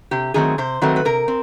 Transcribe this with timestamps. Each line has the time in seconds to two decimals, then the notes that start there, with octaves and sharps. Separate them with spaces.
0.11 C3 G4
0.34 D#3 F#3 A3 C4 G#4
0.58 C3 C5
0.81 D#3 F#3 A3 C4 B4
0.96 B4
1.05 C3 A#4
1.28 C4